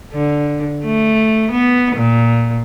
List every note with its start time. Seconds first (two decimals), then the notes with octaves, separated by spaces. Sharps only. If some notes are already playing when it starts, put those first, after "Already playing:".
0.13 D3
0.85 A3
1.51 B3
1.96 A#2